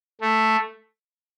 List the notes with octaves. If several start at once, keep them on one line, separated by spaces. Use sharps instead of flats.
A3